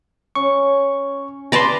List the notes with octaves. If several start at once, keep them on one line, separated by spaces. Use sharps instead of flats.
C#4 C#6
B4 D5 A5 C6 A#6